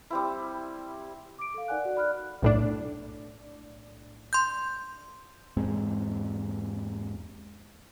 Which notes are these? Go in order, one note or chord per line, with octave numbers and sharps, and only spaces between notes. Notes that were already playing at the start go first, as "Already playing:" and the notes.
G3 C4 E4
D6 D7
A4 F5
D#4 A#4 D5 F#5 G#5 F#6
F#4 D5 F#5
D5 B5 F6 F#6
B1 A2 D4
C6 G6
E2 G#2 G#3 C4